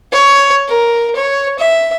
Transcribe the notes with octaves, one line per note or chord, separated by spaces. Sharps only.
C#5
A#4
C#5
E5